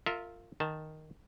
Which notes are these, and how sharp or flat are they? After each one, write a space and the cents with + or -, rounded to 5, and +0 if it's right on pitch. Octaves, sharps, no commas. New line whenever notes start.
F4 +0 A#4 -35 E5 -20
D#3 +0 A5 +0